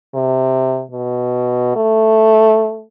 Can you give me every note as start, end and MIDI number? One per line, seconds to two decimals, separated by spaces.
0.14 0.83 48
0.91 1.74 47
1.76 2.84 57